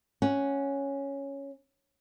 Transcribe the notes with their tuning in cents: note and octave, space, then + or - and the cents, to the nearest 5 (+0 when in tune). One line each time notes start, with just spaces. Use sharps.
C#4 +0 F#5 +0